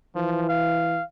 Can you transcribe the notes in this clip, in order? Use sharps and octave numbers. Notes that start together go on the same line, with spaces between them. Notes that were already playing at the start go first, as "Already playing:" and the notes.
E3 F3
F5